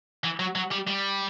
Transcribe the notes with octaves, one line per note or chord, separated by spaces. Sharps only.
E3
F#3
F#3
G3
G3